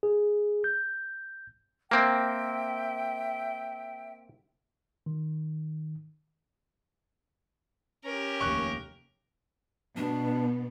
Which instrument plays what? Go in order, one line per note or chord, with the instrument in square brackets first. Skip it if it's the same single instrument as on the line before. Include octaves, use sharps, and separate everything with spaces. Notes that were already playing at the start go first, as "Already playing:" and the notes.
[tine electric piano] G#4
G6
[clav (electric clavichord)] A#3 C4 [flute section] E5 G5
[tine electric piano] D#3
[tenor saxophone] C#4 [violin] G4 A#4
[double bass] F1 D#2 [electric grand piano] C#6 F#6
[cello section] B2 B3 [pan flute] D4